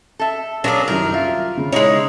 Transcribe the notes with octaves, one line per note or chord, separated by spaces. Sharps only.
A4 E5
F#3 B3 D4 G#4 A#4 F5
C2 F#2 D#3 A#4
F4 E5
C#3
G#3 D#4 E4 C#5